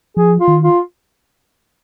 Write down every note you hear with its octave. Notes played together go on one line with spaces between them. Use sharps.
F3 G#4
F4
D#3
F4